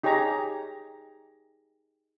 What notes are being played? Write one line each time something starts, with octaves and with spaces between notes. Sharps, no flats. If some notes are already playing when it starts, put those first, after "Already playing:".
D#4 G4 G#4 C#5 A#5